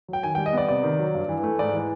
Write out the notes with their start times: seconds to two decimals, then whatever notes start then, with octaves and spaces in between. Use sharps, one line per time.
0.08 F#3 G5
0.23 D#3 G#5
0.35 G3 G5
0.46 D#5
0.53 B3 D5
0.68 C3 D5
0.84 D#3
0.99 F#3
1.14 G2
1.29 E3
1.43 A3
1.59 G#2 D5
1.73 E3